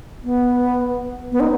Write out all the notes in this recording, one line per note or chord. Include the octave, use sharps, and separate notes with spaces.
B3
B3
D#4